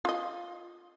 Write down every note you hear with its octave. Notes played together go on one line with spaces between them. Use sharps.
F4 D#5